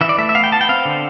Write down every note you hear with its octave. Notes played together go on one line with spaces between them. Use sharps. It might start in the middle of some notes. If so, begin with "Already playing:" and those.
E3 E5
D5
A3 E5
E5
B3 F5
G5
B3 A5
G5
C4 F5
D3